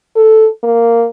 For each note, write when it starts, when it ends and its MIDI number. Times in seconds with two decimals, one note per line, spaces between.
0.16 0.47 69
0.63 1.05 58